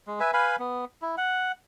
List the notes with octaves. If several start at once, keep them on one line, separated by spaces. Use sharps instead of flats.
G#3
B4 E5 G#5
B4 F5 G#5 B5
B3
E4
F#5